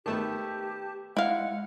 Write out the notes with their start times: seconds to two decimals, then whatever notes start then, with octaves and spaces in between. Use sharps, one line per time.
0.06 D#3 A3 B3 G4 A5
1.17 G#3 E4 F5 F#5